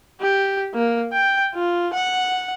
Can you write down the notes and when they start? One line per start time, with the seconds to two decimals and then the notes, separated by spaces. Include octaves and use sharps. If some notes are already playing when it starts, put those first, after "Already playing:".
0.21 G4
0.75 A#3
1.13 G5
1.55 F4
1.93 F#5